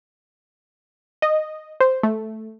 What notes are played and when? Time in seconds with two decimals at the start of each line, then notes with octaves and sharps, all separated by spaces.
1.22 D#5
1.80 C5
2.03 A3